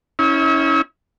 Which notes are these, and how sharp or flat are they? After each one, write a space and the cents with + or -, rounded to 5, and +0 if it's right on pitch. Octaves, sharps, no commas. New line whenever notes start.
C#4 +0 E4 -40 E5 -45